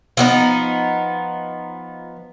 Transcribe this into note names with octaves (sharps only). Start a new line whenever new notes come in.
F3 B3 D#4